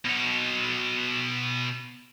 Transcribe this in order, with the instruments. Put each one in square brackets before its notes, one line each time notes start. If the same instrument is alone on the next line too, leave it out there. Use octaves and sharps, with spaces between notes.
[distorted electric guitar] B2 C#5